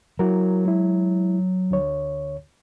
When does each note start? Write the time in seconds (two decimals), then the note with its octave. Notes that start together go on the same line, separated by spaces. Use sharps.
0.19 F#3 E4 F#4 A#4
0.65 G#3 E4
1.71 D2 D3 C#5